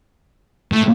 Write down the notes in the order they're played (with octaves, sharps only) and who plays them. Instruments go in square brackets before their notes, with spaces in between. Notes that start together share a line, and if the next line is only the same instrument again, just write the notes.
[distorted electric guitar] A2